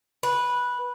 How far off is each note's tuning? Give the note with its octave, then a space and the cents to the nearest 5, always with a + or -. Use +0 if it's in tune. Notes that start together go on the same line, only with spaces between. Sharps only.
B4 -10